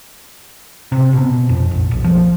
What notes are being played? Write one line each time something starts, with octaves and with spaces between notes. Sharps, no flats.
C3
B2
F2
A#1
A#1
F3